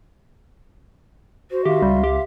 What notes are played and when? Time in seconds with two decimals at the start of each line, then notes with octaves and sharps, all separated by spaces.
1.51 F#4 C5
1.65 D#3 G4 E5 F5 C6
1.82 C#2 G3
2.04 G4